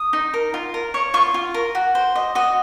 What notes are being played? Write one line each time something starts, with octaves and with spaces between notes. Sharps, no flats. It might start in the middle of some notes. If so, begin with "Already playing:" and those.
Already playing: D#6
D#4
A#4
F4
A#4
C#5
F4 C#6
F4
A#4
F#4
C5
D#5
F#4 D#5